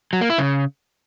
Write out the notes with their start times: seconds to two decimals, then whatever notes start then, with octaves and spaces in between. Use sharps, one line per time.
0.13 F#3
0.21 A#3
0.30 E4
0.38 C#3